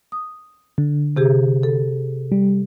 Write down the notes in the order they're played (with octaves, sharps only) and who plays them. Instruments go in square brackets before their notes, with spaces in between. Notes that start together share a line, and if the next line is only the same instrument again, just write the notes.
[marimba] D#6
[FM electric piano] D3
[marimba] C3 G4 G#4
A4
[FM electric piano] G3